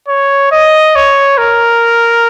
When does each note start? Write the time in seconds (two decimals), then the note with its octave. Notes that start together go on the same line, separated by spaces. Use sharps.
0.08 C#5
0.52 D#5
0.96 C#5
1.38 A#4